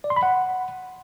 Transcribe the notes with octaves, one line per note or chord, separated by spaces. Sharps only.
D5
C6
B5
F#5